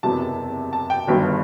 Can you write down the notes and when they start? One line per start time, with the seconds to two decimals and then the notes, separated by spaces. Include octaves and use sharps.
0.03 F#1 E2 C3 F#3 A5
0.73 A5
0.90 G5
1.07 G1 G2 D#3 F#3